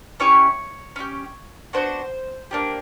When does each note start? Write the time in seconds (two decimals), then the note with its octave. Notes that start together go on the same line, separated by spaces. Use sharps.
0.20 C#4 E4 G4 C#5
0.96 C#4 E4 G4
1.73 B3 D4 F#4 C5
2.51 A#3 D4 G4